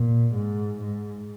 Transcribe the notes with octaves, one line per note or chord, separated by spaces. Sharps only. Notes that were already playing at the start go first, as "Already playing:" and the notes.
Already playing: A#2
G#2
G#2